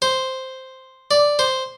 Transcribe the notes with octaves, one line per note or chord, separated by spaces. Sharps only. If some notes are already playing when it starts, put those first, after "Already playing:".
C5
D5
C5